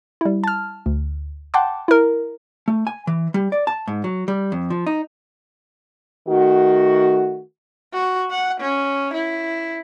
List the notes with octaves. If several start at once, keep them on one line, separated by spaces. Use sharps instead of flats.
G3 E4
A5 F6
D2
F#5 G5 A5 C6 D6
E4 A#4
A3
G#5
E3
G3
D5
A5
G#2
F#3
G3
F2
F3
D#4
D#3 A3 F#4
F#4
F#5
C#4
E4